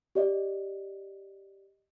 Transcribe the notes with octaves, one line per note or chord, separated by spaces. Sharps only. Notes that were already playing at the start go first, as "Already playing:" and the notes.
G4 D5 D#5